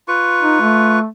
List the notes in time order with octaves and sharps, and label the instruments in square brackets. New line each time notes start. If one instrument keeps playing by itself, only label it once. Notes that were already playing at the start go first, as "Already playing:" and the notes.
[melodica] F4 B4 C#6
[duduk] D#4
A3